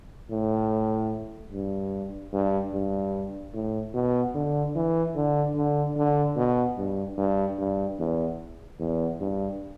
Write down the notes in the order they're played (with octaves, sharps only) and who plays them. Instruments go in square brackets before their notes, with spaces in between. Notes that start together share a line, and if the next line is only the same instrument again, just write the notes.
[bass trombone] A2
G2
G2
G2
A2
B2
D3
E3
D3
D3
D3
B2
G2
G2
G2
E2
E2
G2